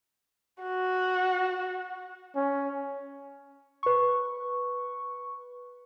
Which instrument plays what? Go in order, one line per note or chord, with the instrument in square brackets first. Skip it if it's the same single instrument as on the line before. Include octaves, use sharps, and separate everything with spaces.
[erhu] F#4
[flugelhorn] C#4
[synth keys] B4 C#6